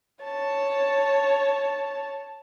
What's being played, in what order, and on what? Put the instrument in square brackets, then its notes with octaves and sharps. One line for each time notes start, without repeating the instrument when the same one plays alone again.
[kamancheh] C#5 A5